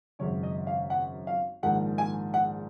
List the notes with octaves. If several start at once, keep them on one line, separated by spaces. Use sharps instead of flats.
G#1 F#2 C#3 C#5
D#5
F5
F#5
F5
A#1 G#2 D#3 F#5
G#5
F#5